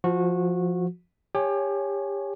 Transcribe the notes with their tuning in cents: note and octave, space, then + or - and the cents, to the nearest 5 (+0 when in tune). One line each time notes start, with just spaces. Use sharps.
F3 +0 F#4 -20
G4 +30 C#5 +0 G#5 +25